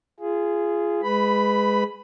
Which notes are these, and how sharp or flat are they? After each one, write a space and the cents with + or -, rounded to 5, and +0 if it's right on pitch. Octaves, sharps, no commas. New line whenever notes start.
F4 -25 G#4 +0
G#3 +0 B4 +20 B5 +0